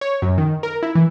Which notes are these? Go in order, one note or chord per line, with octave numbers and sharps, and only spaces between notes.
C#5
F#2
D#3
A#4
E4
E3